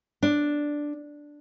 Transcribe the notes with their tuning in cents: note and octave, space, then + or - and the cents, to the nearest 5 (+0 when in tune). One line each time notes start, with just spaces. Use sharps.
D4 +0